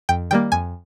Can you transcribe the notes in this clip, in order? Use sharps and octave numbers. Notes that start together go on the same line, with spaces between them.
F2 G5
D#3 G3 A#3 G5
F2 G#5